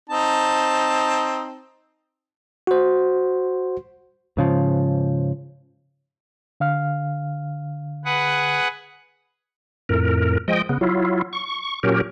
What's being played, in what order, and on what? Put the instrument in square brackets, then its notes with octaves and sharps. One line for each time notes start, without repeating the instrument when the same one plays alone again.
[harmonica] C4 D#4 A5
[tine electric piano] F#4 C5
[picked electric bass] G#2 C#3 F3
[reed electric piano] D3 F5 F6
[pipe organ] G#4 B4 F#5
[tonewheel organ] F2 A2 A#4
F3 G#3 D#5 G5
C#3 B3
F#3 E4 F4
C#6
A#2 F#3 C#4 G4 A#4